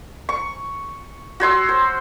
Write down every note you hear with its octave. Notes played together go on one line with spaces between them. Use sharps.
C#6
F#4 C#5 C6 E6
C5